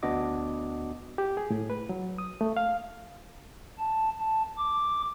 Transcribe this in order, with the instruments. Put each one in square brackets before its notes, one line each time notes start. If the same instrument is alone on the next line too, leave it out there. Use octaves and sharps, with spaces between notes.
[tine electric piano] D2 B3 D4 F#4 D#5 D6
[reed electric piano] G4
G#4
A2
B4
F#3
D#6
A3
F5
[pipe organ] A5
A5
D6